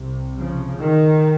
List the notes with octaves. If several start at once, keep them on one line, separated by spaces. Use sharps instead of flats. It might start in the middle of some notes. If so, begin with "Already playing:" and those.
Already playing: C2 C3
C#3 F3
D#3